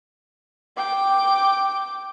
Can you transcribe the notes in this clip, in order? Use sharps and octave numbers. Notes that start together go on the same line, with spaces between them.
G5 D6